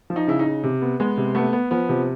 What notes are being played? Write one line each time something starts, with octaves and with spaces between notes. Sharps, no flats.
F3
D#4
C#3 E4
D#4
C#3
C3
B3
G#3 B3
C3
A3 B3
B3
F3 B3
C3 F3